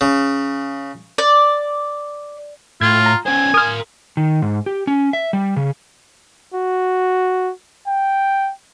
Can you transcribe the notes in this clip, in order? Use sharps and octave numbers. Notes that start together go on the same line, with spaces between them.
C#3
D5
A2 F4 G#6
A#5
C#4 C5 G#5
A#4 C6 D#6 F6
D#3
G#2
G4
C#4
E5
G3
C#3
F#4
G5